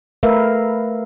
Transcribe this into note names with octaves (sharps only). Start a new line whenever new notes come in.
A3 A#4 B4 E5 F5